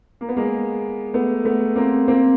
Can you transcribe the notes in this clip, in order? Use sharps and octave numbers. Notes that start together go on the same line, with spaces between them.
A#3
B3
G#3 A#3
A3 B3
A3 B3
A#3 C4
A#3 C4